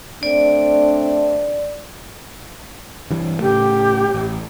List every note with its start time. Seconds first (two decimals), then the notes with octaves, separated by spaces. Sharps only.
0.23 A3 C4 D4 D5
3.11 G2 E3
3.40 A2 C#3 A3 G4
4.14 A1